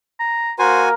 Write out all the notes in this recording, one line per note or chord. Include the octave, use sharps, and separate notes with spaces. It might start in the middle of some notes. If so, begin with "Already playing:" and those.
A#5
A#3 F#4 A#4 C5 G#5